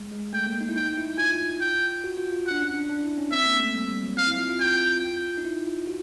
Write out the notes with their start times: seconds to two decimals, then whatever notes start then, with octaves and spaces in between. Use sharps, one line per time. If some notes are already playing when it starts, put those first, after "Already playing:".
Already playing: G#3
0.11 G#3
0.33 A3 G5
0.47 A#3
0.61 D#4
0.69 E4
0.76 D#4 G5
0.97 E4
1.18 F4 G#5
1.61 G5
2.04 F#4
2.18 F4
2.33 F4
2.47 D4 F#5
2.61 C#4
2.74 D4
2.89 D4
3.04 E4
3.18 C#4
3.31 C4 E5
3.46 A#3
3.60 A3
3.74 G3
3.89 G3
4.03 F#3
4.16 C4 F5
4.27 E4
4.38 F4
4.49 F4
4.59 F4 G5
5.38 D#4
5.45 E4
5.66 F4
5.87 F#4